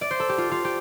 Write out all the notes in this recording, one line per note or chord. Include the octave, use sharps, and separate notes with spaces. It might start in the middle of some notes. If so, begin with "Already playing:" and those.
D5
C5
A4
G4
F4
F4
G4